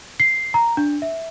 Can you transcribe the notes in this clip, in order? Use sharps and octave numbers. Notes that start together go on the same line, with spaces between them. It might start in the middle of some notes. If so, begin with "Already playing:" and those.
C7
A#5
D4
E5